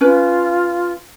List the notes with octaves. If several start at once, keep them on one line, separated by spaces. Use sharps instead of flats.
C#4 F4 B4